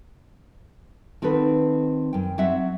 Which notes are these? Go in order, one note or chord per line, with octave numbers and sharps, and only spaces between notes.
D#3 C4 F#4 A4 B4
F#2 G5
F#3 C4 C#5 E5 F#5